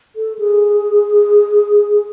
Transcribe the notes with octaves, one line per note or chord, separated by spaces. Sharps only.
A4
G#4